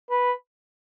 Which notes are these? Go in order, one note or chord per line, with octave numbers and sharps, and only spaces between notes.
B4